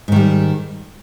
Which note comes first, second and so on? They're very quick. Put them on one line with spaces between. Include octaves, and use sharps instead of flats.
G#2 D#3 G3